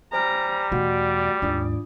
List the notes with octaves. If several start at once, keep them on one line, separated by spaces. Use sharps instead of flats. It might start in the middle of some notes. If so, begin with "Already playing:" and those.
G3 C5 G#5 A#5 F6
E2 B2 A3 F#4 D5 F#5
D#2 G#2 D4 F4 D#6